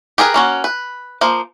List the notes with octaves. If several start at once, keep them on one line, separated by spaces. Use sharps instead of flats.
G4 G#4 A#4 B4
A#3 C#4 F#4
B4
F3 A#3 C5